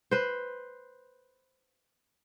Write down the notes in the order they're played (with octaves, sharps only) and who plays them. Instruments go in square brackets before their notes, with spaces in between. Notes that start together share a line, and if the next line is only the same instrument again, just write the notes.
[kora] B4 C5